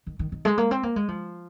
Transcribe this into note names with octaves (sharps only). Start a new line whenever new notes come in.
D#3
D#3
D#3
G#3
A#3
C4
A#3
G#3
F3